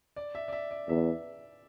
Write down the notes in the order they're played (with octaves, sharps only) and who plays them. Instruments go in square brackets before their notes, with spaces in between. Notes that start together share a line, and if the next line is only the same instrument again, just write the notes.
[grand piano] D5
E5
D5
E5
D5
[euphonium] E2 [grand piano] E5